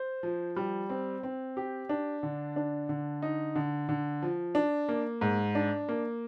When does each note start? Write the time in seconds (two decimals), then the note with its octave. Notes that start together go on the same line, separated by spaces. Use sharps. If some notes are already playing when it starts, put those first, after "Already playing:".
Already playing: C5
0.23 F3
0.56 G3
0.90 C4
1.23 C4
1.57 G4
1.89 D4
2.23 D3
2.56 D4
2.89 D3
3.22 D#4
3.55 D3
3.89 D3
4.22 F3
4.55 D4
4.89 A#3
5.21 G#2
5.55 D4
5.89 A#3